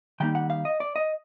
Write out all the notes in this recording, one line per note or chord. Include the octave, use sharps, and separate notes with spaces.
D#3 G3 A#3 D#4 G5
F#5
F5
D#5
D5
D#5